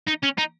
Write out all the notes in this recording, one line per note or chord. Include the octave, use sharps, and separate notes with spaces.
D#4
C#4
D#4